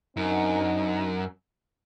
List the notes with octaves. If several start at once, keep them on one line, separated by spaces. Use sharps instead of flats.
F#2 C4 D4 D#4